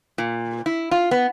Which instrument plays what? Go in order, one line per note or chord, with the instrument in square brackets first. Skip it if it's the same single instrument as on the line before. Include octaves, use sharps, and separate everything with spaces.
[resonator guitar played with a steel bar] A#2
E4
F4
B3